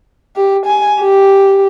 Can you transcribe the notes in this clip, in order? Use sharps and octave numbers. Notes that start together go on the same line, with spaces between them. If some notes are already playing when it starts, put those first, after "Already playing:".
G4
G#5
G4